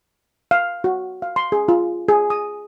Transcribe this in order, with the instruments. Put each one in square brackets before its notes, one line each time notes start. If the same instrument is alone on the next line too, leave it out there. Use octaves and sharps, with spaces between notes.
[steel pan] F5
F#4
F5
C6
G#4
F4
G#4
D#6